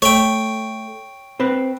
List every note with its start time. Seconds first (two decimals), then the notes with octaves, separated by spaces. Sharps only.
0.02 A3 C#5 G5
1.40 C4 B4